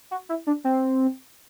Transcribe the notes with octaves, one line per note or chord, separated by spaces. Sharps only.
F#4
E4
D4
C4